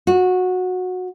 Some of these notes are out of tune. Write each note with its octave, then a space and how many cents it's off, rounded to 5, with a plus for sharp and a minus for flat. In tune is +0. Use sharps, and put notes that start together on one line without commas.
F#4 -15